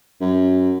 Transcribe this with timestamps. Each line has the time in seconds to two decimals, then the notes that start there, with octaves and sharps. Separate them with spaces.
0.20 F#2